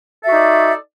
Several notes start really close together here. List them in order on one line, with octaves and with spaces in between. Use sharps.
A4 E5 F#4 D#4 D5